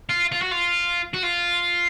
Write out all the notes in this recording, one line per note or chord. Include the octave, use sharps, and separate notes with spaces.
F4
F4
F#4
F4
F#4
F4